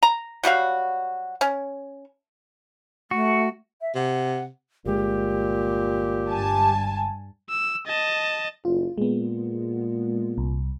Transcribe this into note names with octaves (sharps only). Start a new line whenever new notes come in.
A#5
F#3 G3 F#4 F5
C#4
A3 F#4
E5
C3 F#5
G1 A#2 G#3 G4
G2 G#5 A5
E6
D#5 A5
F#1 F4
A#2 G#3 B3
C2